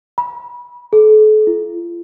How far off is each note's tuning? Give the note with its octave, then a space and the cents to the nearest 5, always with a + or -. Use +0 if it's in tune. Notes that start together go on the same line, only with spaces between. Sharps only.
B5 -25
A4 -40
F4 -40